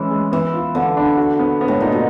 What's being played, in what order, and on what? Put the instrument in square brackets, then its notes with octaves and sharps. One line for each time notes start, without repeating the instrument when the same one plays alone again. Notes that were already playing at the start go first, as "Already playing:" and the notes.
Already playing: [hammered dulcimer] E3 [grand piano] G#3 C#4
[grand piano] G#3
[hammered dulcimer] E3 [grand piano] B3
[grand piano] F4
[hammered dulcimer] D3 [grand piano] B3
[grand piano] D4
F#4
B3
B3
[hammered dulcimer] A2
[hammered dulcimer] A#2 [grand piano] D#4
[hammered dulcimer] B2